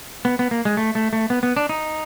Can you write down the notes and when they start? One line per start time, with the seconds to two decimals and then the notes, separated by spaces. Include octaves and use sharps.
0.25 B3
0.39 B3
0.51 A#3
0.65 G#3
0.77 A3
0.95 A3
1.13 A3
1.30 B3
1.43 B3
1.57 D4
1.69 D#4